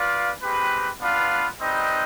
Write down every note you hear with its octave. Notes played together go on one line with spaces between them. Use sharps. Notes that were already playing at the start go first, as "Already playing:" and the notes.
Already playing: F4 B4 D5 F5
G#3 C4 G4 B4
B3 D4 F4 B4 F5
G3 C4 D#4 B4 D#5